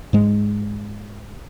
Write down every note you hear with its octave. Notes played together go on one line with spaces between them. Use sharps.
G#2 G#3